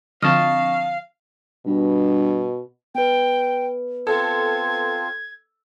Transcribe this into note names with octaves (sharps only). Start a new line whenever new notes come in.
D3 F3 C4 D#5 F5 A5 C#6 F6
G2 B2
B3 B4 G5
C4 F4 A4 G#6